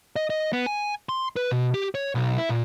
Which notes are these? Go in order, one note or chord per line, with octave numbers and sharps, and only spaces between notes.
D#5
D#5
B3
G#5
C6
B4
B2
G4
C#5
B1
E4
A#2